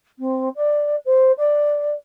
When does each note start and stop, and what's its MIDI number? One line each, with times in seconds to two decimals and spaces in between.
0.19 0.49 60
0.56 0.96 74
1.06 1.32 72
1.38 1.94 74